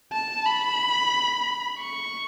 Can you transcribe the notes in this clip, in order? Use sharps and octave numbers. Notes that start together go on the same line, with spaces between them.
A5
B5
C#6